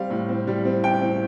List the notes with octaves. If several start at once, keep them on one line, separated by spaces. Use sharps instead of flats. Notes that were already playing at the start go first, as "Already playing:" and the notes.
Already playing: G3 C4 F5
A2
C4
G3
C4
A1 G5
C4